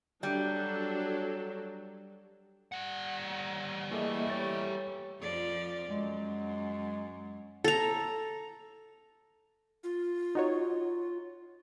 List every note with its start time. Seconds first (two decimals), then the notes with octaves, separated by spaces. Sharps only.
0.23 F#3 G3 D4 A4
2.72 G3 F#5
3.91 E3 A3 A#3 G#4 D#5
4.30 G4 C#5 A6
5.21 F2 F3 D5
5.90 F#2 G#3
7.64 A4 A#5
9.84 F4
10.35 D#4 F#4 C#5